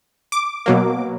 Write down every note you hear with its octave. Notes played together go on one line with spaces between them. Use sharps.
D6
B2 F#3 A#3